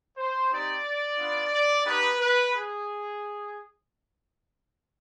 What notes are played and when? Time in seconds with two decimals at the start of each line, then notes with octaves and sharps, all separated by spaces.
0.17 C5
0.51 C4 D#4 G4 D5
1.18 B3 D4 F4
1.52 D5
1.85 B3 D#4 G4 B4
2.19 B4
2.52 G#4